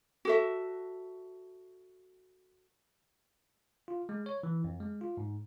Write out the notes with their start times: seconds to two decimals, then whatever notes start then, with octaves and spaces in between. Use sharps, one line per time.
0.25 F#4 A4 E5
3.88 F4
4.09 G#3
4.26 C#5
4.43 E3
4.64 F2
4.80 G#3
5.01 F4
5.17 G#2